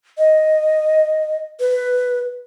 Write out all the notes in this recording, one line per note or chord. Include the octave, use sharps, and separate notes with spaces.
D#5
B4